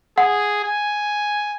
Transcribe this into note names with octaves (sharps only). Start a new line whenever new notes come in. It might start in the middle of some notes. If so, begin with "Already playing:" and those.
G#4 F#5
G#5